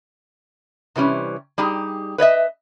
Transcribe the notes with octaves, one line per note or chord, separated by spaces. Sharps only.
C3 E3 G3 C#4
G3 D#4 G4 G#4
B4 C#5 D#5 E5